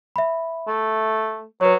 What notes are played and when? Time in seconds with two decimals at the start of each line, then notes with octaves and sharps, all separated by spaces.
0.16 E5 B5
0.67 A3
1.61 F#3 B4 C#5